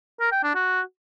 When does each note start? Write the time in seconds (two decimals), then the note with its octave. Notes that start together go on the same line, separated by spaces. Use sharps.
0.20 A#4
0.32 G5
0.43 D4
0.55 F#4